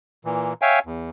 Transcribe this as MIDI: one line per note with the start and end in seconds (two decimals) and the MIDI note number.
0.25 0.53 46
0.25 0.53 52
0.62 0.79 73
0.62 0.79 76
0.62 0.79 77
0.62 0.79 79
0.62 0.79 80
0.86 1.10 40